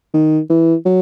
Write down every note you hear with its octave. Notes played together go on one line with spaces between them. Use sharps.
D#3
E3
F#3